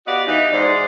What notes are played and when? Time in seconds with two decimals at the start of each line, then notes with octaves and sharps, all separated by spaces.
0.07 B3 F#4 G4 D5 D#5 F5
0.27 E3 D#4
0.53 G#2 C5 D5